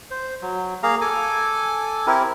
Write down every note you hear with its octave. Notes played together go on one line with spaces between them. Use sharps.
C5
F#3
A#3 G#4 F5 A#5
A4 G#5 D6
C4 E4 G4 A#4